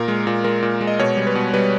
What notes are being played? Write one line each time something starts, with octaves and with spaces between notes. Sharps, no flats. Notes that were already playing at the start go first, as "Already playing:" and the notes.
Already playing: A#2 A#4
G#3
A#2
G#3 A#4
A#2
G#3
D#5
B2 C#5
G3
B4
B2
G3 B4